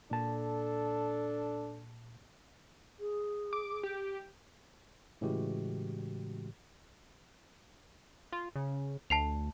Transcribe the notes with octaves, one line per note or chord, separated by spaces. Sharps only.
A#2 D4 A4 A5
G#4
D6
G4
A2 C#3 E3 G#3 F#4 G4
F4
C#3
D2 A5 C7 F7